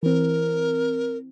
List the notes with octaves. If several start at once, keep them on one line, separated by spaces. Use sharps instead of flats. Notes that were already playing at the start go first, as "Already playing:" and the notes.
E3 C4 A#4